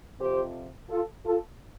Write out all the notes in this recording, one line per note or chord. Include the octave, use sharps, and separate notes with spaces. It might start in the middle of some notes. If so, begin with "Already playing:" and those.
F2 C3 F3 G4 C5
F4 A4
F4 A4